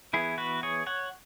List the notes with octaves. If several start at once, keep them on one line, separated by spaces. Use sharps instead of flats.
E3 B3 E4 G#4
F#4 B4
G#4 C#5
C#5 F#5